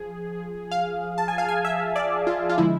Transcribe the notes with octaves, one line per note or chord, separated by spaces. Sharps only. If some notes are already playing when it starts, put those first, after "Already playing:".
Already playing: F3 G#4
F5
A5
G#5
F5
G#5
E5
D5
F4
F4
D3 F3 G#3 E4